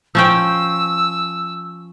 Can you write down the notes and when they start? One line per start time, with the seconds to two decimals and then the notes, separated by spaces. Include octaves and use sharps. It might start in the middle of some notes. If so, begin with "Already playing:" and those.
0.15 F3 C#4 G5 E6